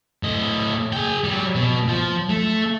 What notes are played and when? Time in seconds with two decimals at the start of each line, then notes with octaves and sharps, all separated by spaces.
0.23 A2 D#5
0.93 G#4 G5
1.24 F#3 G3
1.55 B2
1.88 F3
2.29 A3